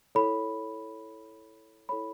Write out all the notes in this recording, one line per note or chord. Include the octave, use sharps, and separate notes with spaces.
E4 A4 C#5 B5
E4 A4 C#5 B5